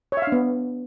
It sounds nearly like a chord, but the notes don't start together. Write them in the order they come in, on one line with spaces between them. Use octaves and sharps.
C#5 E5 F5 D4 B3